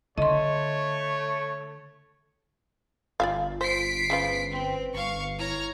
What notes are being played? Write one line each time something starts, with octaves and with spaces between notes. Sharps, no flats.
D3 A3 C#5 D#5 C6
G1 F4 D5 E5 F5
C5 B6 C7 D7
C#3 F3 F4 B4
C4
G1 F5 C#6
E4 C#5 A#5 F6